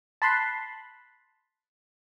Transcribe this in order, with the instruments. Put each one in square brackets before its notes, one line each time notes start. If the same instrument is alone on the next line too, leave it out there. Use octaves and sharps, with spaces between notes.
[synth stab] A5 B5 C6 F#6